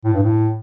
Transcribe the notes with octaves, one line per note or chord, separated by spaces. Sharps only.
A2
G2
A2